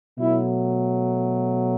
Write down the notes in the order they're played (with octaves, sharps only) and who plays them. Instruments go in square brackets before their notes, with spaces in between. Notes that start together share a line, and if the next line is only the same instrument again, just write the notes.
[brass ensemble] B2 F#3 A3 E4